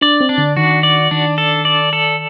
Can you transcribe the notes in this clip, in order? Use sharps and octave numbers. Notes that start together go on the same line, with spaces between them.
D4 D5
C4
D4
D3
D#3 F#4
D5
D#3 D4
A4
D5
A4